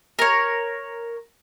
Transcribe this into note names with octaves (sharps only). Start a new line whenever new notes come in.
A#4 C#5